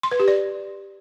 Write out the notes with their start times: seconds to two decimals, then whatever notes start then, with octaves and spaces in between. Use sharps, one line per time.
0.03 C6
0.11 B4
0.20 G4
0.28 D5